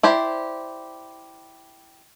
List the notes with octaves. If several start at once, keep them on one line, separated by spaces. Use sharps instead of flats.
E4 G4 C5 D5